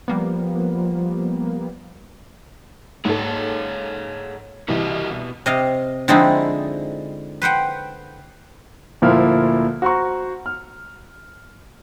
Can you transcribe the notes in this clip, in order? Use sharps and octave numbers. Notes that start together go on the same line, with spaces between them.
F3 G3 A#3 B3
G#2 G#4 A4 C#5 F#5
C2 E3 F#4 G4 D#5
B2
C3 D#5 F5
D3 F3 G#3 C4 D#4 E4
B4 C5 F#5 G5
D2 A#2 F3 A#3 E4 F6
F#4 C5 A#5 C#6
F6